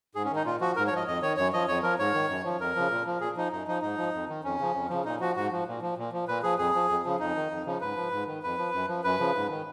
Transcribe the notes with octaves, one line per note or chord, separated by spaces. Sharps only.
G#2 G#4
C#4
D#3
D#4
A#2 F4
F3 F#4
G#2 A#4
C#5
F3 D#5
F2 D#5
D#3 C#5
F#2 C#5
F3 D#5
F2 C#5
F3 A#4
G#2 C#5
D#3
F#2
F3
F2 A#4
C#3 F3
A#2
F3
A#2 G#4
F3 D#4
F#2 D#4
F3 D#4
G#2 D#4
F3
F2
D#3
F2 C#4
C#3 F3
F2
C#3 F3
A#2 D#4
F3 F#4
G#2 F#4
F3
A#2
F3
A#2
F3
A#2 B4
F3 G#4
F2 G#4
F3
F2
C#3 F3
F2 D#4
D#3
F2
C#3 F3
G#2 B4
F3
G#2
D#3
F2 B4
F3
F#2
F3
F#2 B4
C#3 F3
G#2
D#3